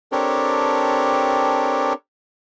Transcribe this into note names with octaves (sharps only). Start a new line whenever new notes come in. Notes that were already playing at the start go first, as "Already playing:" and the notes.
C4 D4 G4 A4 A#4 C#5